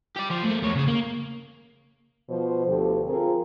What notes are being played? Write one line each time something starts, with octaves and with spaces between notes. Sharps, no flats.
G4 D5
F3 C5
A3 A#3
E2 C#5
C#3 G#4
A#3
B2 F3 C5
D2 B2 F3 G4 A4
F3 C4 F4 G#4 A#4